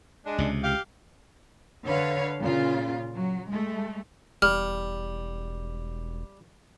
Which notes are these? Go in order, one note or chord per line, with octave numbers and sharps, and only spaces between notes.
G#3 D4
C#2 C3
G4 F5
D3 B4 C#5 F5
A#2 C#3 F4
F#3
G#3 A3
E1 G3 F6